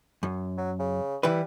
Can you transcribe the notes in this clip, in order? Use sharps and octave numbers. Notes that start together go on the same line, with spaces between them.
F#2
F#3
C#3
E3 G3 E4 B4